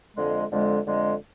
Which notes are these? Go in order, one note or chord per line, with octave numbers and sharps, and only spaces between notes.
F2 D3 G#3
F2 D3 G#3
F2 D3 G#3